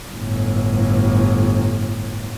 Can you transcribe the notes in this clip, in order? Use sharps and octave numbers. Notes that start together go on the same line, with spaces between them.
G1 A2